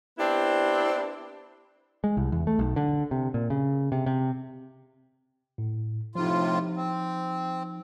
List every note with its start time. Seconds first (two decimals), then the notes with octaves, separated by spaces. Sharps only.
0.19 B3 C4 D4 E4 G4
2.04 G#3
2.17 C2
2.32 E2
2.47 A3
2.59 B1
2.76 D3
3.11 C3
3.34 A#2
3.50 C#3
3.92 C3
4.06 C3
5.58 A2
6.15 A2 C3 F3 D#4 F4
6.76 C4